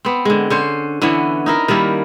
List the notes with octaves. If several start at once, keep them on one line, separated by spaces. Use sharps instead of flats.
B3 C4
D3 G#3
D3 C#4 C5
D3 E3 B3 C#4
D#4 E4 A#4
D#3 G3 A#3 E4